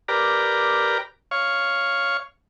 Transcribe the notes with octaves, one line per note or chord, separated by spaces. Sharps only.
G4 A#4 B4 D5 A#5
C#5 F5 C#6